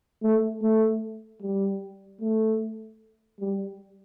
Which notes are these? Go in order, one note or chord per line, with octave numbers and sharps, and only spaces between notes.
A3
A3
G3
A3
G3